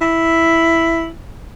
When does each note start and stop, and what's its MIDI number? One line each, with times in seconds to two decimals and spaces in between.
0.01 1.09 64